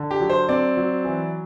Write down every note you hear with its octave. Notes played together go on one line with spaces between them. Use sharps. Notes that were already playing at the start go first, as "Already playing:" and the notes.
Already playing: D3
G4
F#3
C5
C4 D5
F#3
E3